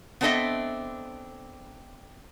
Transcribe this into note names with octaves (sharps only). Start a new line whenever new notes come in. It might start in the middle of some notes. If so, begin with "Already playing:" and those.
B3 C4 D4 A4 D#5 E5